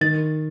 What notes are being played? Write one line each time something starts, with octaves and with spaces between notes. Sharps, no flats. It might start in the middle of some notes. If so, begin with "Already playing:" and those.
D#3 A6